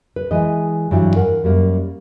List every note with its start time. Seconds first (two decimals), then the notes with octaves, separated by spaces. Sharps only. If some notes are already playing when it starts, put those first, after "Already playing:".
0.16 B4
0.31 E3 G#3 D#5
0.91 G2 E3 F#3 G3
1.16 A#4 F5 F#5
1.44 F#2 G3 A#3